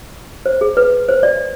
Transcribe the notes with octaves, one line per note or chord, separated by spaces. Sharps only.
C5
G#4
B4
C5
D5